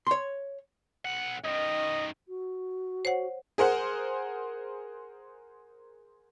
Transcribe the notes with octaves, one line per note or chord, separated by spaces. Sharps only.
C#5 C6
B1 F#5
F#2 D#3 D#5
F#4
C5 C#5 F#5
G#4 A#4 C5 F#5